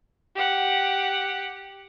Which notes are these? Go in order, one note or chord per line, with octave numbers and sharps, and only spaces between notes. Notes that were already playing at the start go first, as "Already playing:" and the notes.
G4 F#5